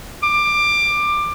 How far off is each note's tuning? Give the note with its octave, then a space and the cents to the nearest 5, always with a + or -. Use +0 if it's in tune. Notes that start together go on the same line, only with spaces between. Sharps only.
D6 +20